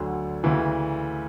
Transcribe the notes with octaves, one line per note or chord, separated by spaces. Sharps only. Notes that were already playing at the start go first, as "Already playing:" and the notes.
Already playing: D2 D3 F#3
D2 C#3 E3